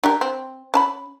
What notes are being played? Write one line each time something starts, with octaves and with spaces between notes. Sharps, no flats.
D4 G4 A#4
C4
C#4 A5 B5